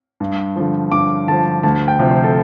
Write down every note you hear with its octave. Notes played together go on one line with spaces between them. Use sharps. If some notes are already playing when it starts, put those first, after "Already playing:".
G2
D3 F3
G2 D6
D3 F3 A5
D2 A5
G5
C3 F3
C5
A4